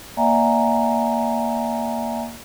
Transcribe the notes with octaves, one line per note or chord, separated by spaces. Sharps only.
A#3 D5 E5 F#5 G#5 A#5